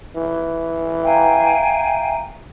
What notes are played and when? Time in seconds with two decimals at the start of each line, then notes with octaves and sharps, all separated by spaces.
0.16 E3
1.03 E5 F5 G5 G#5 A#5